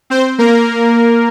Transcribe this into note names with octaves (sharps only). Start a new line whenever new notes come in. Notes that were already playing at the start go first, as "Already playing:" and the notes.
C4 C5
A#3 A#4